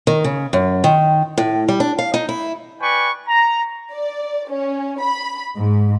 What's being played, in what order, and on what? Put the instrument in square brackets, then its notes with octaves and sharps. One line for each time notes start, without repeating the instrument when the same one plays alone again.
[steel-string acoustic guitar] D#3
C#3
F#2
D#3
A2
G3
D4
F5
D#4
E4
[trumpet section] B4 D5 G5 G#5 C#6
A#5
[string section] D5
C#4
B5
G#2